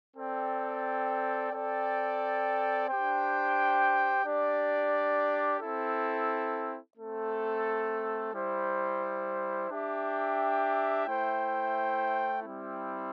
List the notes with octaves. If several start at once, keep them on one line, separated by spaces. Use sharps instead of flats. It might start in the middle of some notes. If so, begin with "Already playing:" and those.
C4 A4 D5 G5
C4 A4 D5 G5
D4 G4 C5 G5
D4 G4 D5
C4 E4 A4
A3 C4 A4
G3 E4 C5
D4 G4 E5 G5
A3 E4 C5 G5
G3 C4 E4